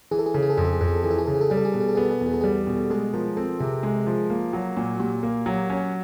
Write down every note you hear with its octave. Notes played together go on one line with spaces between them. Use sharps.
E3 G#4
A4
G#4
C#3 A4
G#4
A4
F2 G#4
A4
G#4
F2 A4
G#4
A4
E3 G#4
A4
G#4
C#3 A4
G#4
A4
G3 G#4
A4
G#4
B2 A4
G#4
A4
B3 G#4
A4
G#4
E2 A4
G#4
A4
G3 G#4
B2
G#3 A4
F3 A#4
C4 A4
C3 G#4
G#3
F3
A#3
F#3
A#2
F#4
A#2 G4
A#3
F#3
C#4